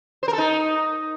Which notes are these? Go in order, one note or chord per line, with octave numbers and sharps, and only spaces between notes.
C5
A#4
A4
D#4